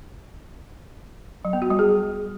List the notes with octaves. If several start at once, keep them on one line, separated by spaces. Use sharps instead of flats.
F#3
B3
F#4
G3
G#4